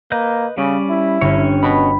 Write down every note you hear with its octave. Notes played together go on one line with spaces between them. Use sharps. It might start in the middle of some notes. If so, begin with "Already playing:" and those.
A#3 B4 D#5 G6
C#3 G3 C#4 D5
E4
G1 C#4 C#5
B2 B5